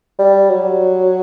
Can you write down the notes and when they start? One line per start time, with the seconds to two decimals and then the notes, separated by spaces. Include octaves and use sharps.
0.19 G3
0.50 F#3